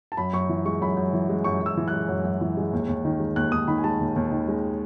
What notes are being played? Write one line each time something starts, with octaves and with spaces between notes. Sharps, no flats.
A5
F#2 B5
F#2 C#6
E3
G#3 C#6
F#2 B5
F#2
E3
G#3
F#2 C#6
F#2 E6
E3
F#6
G#3
F#2
F#2
E3
G#3
D#2
D#2
D#3
G#3
D#2 F#6
D#2 D#6
D#3 B5
G#5
G#3 A5
D#2
D#2
D#3
G#3